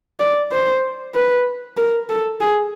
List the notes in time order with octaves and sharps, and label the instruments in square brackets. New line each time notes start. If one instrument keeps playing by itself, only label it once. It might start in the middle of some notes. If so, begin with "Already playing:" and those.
[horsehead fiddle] D5
C5
B4
A#4
A4
G#4